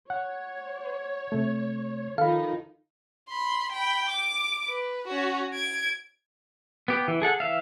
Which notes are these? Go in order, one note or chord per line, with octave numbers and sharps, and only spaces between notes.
C#5 F#5
C3 A3
D#3 F3 D#4 A4 F5 B5
B5 C6
G5 B5
D6
B4
C#4 F#4
G#6 D7
B3 G4
E3
G#4 A4 F#5
E3 E5 F5